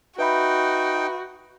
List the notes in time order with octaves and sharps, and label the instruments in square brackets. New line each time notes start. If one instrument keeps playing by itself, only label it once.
[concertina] D#4 G5 [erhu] F#4 [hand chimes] B4 E5 B5